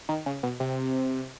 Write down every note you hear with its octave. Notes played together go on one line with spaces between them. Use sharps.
D#3
C#3
B2
C3